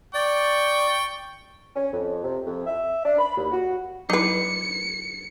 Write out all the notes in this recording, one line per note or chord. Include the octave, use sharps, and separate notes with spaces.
D5 G5 C#6
C#4
F2
C3
F2
E5
D4
B5
D#2
F#4
F#3 D#4 E4 B4 C#7